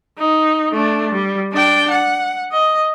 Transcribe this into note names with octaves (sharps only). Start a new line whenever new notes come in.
D#4
A3 D4
G3
D4 G5
F#5
D#5